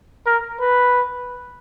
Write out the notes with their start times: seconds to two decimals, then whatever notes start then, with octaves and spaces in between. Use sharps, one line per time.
0.26 A#4
0.60 B4